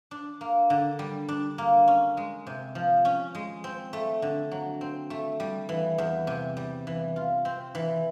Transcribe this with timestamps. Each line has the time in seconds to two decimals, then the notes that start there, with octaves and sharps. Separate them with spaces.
0.11 D4
0.41 A#3
0.70 D3
0.99 G3
1.29 D4
1.58 A#3
1.88 C#4
2.17 G#3
2.47 C3
2.75 F3
3.05 C#4
3.35 G#3
3.64 C4
3.93 A3
4.22 D3
4.52 F#3
4.81 C4
5.10 A3
5.40 G3
5.69 E3
5.98 E2
6.27 C3
6.57 G3
6.87 E3
7.16 F4
7.45 C4
7.75 E3